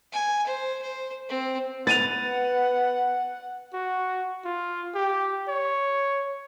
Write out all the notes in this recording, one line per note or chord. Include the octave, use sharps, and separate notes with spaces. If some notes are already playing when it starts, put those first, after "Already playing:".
G#5
C5
C5
C4
B3 B4 F#5 A6 D#7 F7
F#4
F4
G4
C#5